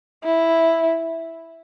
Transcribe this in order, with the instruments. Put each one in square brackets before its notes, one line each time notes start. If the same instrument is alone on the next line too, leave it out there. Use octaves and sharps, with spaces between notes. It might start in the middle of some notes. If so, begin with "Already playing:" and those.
[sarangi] E4